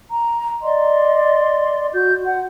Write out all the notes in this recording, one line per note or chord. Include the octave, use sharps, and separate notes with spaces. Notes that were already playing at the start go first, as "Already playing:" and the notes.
A#5
D5 D#5 C6
F#4 G6
F#5